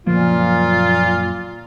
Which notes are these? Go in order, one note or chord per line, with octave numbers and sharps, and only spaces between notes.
F#1 A#2 F3 A#3 F4